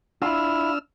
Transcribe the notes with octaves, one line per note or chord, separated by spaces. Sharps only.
D4 E4 F4 E6 F6